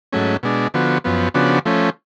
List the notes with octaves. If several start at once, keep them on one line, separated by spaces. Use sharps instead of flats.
G#2 F#3 A3 C#4
B2 G#3 D4
D3 F3 B3 F#4
F#2 F3 B3
C#3 F3 B3 D4 F#4
F3 A3 C#4